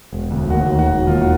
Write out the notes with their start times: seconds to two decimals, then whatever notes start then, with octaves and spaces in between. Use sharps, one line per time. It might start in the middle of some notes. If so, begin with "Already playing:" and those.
0.12 E1
0.31 D2
0.50 D#2 F#4
0.70 D#2
0.79 F#4
0.88 E1
1.07 D#2 F4
1.21 F#4